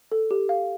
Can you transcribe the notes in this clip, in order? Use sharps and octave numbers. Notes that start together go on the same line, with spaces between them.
A4
G4
F5